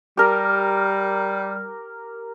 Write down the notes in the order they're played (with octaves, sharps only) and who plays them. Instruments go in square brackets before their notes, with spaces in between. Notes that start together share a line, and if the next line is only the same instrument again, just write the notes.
[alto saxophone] G3 [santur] G4 A#4